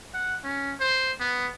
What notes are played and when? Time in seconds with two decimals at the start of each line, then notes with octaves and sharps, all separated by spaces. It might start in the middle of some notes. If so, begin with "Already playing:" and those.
0.14 F#5
0.44 C#4
0.80 C5
1.20 B3